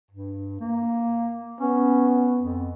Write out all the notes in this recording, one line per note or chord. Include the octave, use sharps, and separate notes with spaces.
G2
A#3
B3 C#4
F2